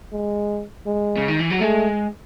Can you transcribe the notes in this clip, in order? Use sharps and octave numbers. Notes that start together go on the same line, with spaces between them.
G#3
G#3
C#3
D#3
E3
F#3
G#3 A3